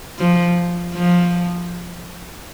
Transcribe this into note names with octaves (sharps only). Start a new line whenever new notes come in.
F3
F3